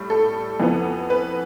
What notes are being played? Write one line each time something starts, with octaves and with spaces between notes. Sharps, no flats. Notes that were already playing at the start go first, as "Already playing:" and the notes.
Already playing: A2 G3
A4
F2 E3 B3
B4